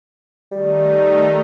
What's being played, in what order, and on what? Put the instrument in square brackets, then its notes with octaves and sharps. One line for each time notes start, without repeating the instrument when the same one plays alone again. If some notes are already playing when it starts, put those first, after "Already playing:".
[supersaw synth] D#3 A3 D#4 [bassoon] G3